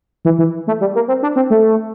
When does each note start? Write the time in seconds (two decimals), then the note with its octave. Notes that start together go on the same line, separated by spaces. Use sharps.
0.25 E3
0.38 E3
0.67 A3
0.81 G3
0.95 A#3
1.08 C4
1.23 D4
1.36 C4
1.50 A3